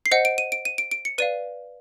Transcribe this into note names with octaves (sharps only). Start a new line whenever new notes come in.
C7
C5 D#5 F#5 C#7
D7
D#7
D7
D#7
D7
D7
C#7
B4 D5 F5 D#7